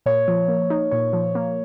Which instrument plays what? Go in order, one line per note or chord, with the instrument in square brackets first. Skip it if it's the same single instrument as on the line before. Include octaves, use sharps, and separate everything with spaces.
[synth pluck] A#2 [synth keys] C#5
[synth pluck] F3
A#3
D#4
[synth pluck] A#2 [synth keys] C#5
[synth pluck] F3
A#3